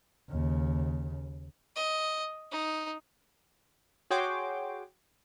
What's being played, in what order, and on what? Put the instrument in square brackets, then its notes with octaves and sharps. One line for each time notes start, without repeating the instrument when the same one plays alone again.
[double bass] D#2 C#3
[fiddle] D#5
D#4
[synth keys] F#4 G#4 C#5 G5 C6 D6